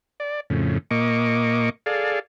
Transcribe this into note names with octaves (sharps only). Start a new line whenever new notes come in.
D5
F2 A2 C#3
A#2 A#3 D#5 C#6 D6
G#4 A4 D5 F5